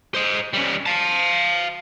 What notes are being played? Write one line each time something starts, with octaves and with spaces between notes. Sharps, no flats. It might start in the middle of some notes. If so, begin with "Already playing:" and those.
C5 D#5
G3 C#4
F5 A5